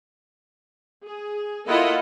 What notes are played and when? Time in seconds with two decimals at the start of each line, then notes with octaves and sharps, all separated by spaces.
1.03 G#4
1.67 A#3 E4 F4 A4 D#5 F#5